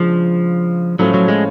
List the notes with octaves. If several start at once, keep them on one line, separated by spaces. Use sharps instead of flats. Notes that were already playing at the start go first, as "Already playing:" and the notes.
Already playing: C#3 F3 G#3 D4
A2 F3 F#3 A3 C#4
F#3
G#3